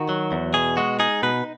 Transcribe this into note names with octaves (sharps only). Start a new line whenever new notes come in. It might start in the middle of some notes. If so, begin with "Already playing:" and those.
Already playing: D#3 F#4
F#3
E2
B2 G#4
G#3 F#4
D#4 G#4
B2 B4